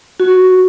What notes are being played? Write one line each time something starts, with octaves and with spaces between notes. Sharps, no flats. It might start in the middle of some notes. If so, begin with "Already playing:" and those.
F#4